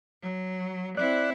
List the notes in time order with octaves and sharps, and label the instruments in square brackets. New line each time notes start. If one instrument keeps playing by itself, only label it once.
[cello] F#3
[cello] C4 E4 [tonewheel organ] D5 F#6